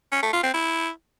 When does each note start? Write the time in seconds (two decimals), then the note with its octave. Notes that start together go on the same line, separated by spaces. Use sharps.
0.12 C#4
0.23 A3
0.33 F4
0.43 C4
0.54 E4